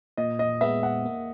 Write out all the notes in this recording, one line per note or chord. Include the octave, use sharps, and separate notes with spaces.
A#2 D#5
D#5
G#3 B3 E5
F#5
A#3